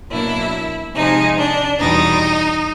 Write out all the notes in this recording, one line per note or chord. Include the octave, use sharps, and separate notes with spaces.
B2 F#3 A#3 D4 E4
C3 F3 G#3 D#4
D4
E2 B2 G3 D#4